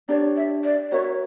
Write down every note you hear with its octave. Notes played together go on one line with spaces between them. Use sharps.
D4 G4 C#5 D5
E5
D5
F#4 A#4 C#5 E5